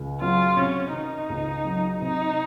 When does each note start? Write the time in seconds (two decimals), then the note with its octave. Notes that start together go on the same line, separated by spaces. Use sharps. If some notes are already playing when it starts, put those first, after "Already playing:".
Already playing: C#2
0.21 F#3 F4
0.56 C3 C#4
0.93 D#3 D#4
1.29 C#2
1.64 F#3
2.01 C3 D#4